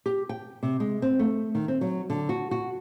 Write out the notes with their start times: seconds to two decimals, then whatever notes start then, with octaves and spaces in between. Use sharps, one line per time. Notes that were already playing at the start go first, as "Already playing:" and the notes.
0.06 G4
0.29 G5
0.63 C3
0.80 G#3
1.02 C4
1.19 A3
1.55 D#3
1.68 C4
1.81 F#3
2.10 D3
2.29 F#4
2.51 F#4